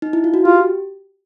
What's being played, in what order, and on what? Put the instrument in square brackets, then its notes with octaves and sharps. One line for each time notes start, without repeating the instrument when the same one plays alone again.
[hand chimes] D#4
E4
F4
F#4
[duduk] F4 [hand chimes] G4